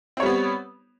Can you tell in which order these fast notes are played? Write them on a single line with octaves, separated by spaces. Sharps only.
C4 C#5 G3 B3